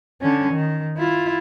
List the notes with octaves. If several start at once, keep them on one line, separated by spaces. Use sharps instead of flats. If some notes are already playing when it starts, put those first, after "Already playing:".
D3 C#4
D#3
E4 F4